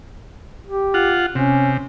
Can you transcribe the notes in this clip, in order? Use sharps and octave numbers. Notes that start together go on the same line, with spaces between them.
G4
F4 F#5
C3 C#4